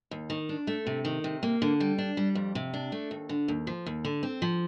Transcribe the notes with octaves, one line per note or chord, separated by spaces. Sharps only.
D#2
D#3
D4
A3
C3
D#3
C3
A#3
D3
G3
D4
G3
F2
C3
D4
A3
D#2
D3
D#2
F3
D#2
D3
C4
F3